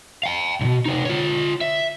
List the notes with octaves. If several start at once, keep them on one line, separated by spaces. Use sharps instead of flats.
F5 G5
B1 B2
C3 D#4
F4 C#5
E5